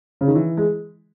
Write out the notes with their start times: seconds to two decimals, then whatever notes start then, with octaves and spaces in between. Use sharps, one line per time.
0.21 C#3
0.27 D#3
0.35 E3
0.57 G#3